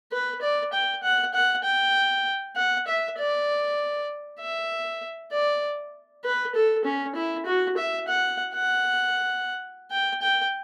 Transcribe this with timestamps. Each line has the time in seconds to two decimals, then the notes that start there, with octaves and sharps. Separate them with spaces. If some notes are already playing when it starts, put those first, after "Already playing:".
0.12 B4
0.42 D5
0.73 G5
1.03 F#5
1.34 F#5
1.64 G5
2.56 F#5
2.87 E5
3.18 D5
4.40 E5
5.32 D5
6.24 B4
6.55 A4
6.85 C#4
7.15 E4
7.46 F#4
7.77 E5
8.08 F#5
8.54 F#5
9.91 G5
10.22 G5